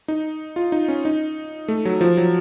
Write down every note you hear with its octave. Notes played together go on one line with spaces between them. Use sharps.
D#4
F4
D#4
C#4
D#4
A3
F#3
F3
F#3